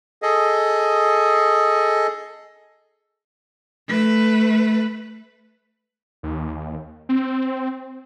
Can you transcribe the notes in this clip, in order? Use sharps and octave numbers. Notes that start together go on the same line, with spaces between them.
G#4 A4 D#5
A3 B4
D#2
C4